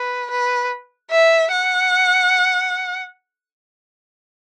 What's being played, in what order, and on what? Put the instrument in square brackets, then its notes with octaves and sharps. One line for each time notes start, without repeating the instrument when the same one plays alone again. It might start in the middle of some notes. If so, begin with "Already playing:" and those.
Already playing: [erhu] B4
B4
E5
F#5